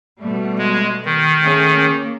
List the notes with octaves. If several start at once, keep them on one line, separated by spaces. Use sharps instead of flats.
B2 G3 A3
G#3
D#3
A3 C#4 G#4
A#3